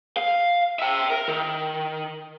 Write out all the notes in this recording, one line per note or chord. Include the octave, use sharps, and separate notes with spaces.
F5
E5 G5
A#4
D#3